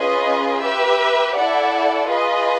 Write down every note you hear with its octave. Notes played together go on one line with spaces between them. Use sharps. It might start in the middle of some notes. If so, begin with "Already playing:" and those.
Already playing: C#4 F4 G#4 B4 D#5
G4 B4 E5
E4 A4 D5 F#5
F4 G#4 B4 D#5